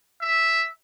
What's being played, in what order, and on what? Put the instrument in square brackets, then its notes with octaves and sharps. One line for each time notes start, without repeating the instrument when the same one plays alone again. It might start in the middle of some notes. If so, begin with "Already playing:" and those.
[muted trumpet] E5